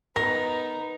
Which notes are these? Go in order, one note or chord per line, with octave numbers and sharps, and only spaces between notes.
B3 D#4 A#4 A#6